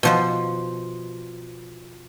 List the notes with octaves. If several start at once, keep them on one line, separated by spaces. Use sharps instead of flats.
B2 F3 C5